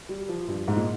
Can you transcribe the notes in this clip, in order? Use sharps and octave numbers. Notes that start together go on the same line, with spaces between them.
G3
F3
G2
G#2
A#2